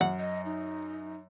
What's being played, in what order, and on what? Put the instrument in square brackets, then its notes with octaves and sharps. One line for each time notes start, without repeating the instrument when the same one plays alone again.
[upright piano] F#2 [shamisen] F#5
[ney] D#5
D#4